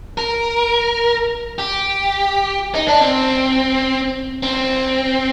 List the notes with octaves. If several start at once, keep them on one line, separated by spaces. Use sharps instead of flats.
A#4
G4
D#4
D4
C4
C4